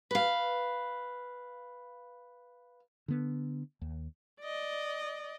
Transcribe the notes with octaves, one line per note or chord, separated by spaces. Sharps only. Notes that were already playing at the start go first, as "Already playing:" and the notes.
B4 F5
D3 B3
D#2
D5 D#5